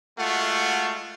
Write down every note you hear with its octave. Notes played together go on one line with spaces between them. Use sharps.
G#3 A3 F4 F#4 F#5